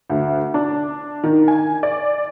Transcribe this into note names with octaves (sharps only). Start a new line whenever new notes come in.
D2
D4
D#3
G#5
D5